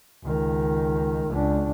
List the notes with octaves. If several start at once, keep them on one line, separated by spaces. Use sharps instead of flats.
C#2 D#3
C#2 D4